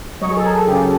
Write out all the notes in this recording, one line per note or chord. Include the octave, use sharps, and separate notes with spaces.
F#3 C#5 D#5
G#4
A4
G#4 A#4
C#3 G4 A4